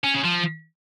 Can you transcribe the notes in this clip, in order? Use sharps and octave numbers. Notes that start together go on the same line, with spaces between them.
C#4
C#3
F3